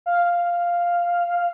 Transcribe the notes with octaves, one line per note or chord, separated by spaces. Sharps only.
F5